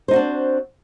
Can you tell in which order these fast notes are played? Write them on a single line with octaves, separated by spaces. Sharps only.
C5 D#4 F#4 D4 C4